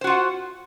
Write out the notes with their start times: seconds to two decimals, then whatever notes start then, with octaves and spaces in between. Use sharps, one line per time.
0.01 C5
0.04 F#4
0.07 F4
0.10 F#5